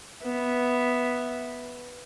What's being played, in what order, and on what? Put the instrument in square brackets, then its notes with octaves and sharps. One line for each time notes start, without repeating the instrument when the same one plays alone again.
[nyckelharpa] B3 E5